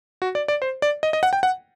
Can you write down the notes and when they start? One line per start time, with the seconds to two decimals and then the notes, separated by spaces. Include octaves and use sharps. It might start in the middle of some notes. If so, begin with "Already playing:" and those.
0.22 F#4
0.35 D5
0.48 D5
0.62 C5
0.82 D5
1.03 D#5
1.13 D#5
1.23 F#5
1.33 G5
1.43 F#5